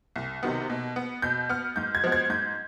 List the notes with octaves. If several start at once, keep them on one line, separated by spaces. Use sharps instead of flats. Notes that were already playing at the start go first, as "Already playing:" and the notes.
C2
C3 D#3 B3
B2
B3
B2 G6
B3 F6
G#2 G6
G#6
F3 G#3 B3
G#6
G#2 G6